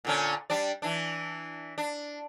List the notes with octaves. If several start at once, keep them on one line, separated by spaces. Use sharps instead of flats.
A#2 D3 C#4
G3 D4 D5
E3 D4
D4